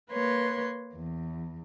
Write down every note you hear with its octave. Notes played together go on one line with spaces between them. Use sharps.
A#3 B4 C#5 C6
E2